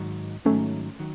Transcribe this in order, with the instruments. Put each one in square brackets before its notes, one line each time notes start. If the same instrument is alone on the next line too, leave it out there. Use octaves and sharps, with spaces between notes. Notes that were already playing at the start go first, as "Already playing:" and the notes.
Already playing: [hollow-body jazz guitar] G#2 D#3 F#3
[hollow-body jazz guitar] G#2 D#3 F#3 [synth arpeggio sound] A3 C#4
[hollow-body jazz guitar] D#3 F#3